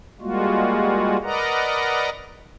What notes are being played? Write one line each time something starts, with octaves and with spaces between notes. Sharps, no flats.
G3 G#3 A#3 F4 F#4
A#4 B4 D5 D#5 F#5 A#5